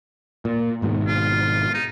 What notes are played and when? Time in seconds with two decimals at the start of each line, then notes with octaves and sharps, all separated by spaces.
0.45 A#2
0.82 G#1 G#2 B2
1.08 F4
1.74 D#4